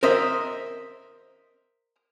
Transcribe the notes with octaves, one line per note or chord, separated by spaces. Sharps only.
A#4 C5 D#5 E5